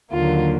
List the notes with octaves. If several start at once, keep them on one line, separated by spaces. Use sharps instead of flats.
D#2 D3 F#3 A#3 F4